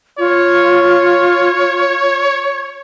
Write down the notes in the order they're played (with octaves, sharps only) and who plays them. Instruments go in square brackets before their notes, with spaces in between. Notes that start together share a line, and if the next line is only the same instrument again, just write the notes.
[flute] F4 [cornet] C#5